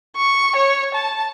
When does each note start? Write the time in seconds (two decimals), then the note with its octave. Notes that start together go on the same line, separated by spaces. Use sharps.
0.16 C#6
0.56 C#5
0.94 A5